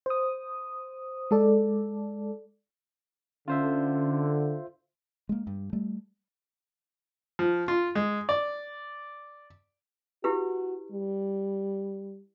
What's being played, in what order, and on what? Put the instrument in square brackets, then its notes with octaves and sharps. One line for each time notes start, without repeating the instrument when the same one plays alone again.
[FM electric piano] C5 D#6
G#3 A4 D5
[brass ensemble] D3 [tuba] C#4 [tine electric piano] F4 C5 E5
[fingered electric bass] G#3 A#3
G2
G3 A3
[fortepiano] F3
F4
G#3
D5
[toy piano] E4 G4 B4 [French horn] F#4
[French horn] G3